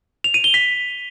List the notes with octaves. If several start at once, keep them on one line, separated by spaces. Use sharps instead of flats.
F7
D#7
G7
B6